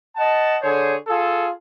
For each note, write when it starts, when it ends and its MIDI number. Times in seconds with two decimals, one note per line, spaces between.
0.16 0.56 75
0.16 0.56 78
0.16 0.56 81
0.62 0.94 50
0.62 0.94 68
0.62 0.94 72
0.62 0.94 73
1.07 1.48 65
1.07 1.48 68
1.07 1.48 69